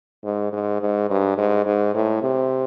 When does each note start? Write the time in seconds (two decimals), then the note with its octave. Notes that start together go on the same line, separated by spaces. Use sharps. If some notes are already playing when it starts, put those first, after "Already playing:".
0.24 G#2
0.53 G#2
0.81 G#2
1.10 G2
1.38 G#2
1.66 G#2
1.94 A2
2.22 C3